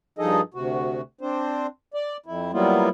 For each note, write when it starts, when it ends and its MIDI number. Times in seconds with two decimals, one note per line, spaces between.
0.19 0.41 43
0.19 0.41 53
0.19 0.41 63
0.19 0.41 68
0.19 0.41 69
0.19 0.41 75
0.54 1.01 38
0.54 1.01 48
0.54 1.01 66
1.21 1.67 60
1.21 1.67 62
1.21 1.67 72
1.94 2.17 74
2.26 2.52 41
2.26 2.52 64
2.53 2.89 54
2.53 2.89 55
2.53 2.89 58
2.53 2.89 59
2.53 2.89 64
2.53 2.89 65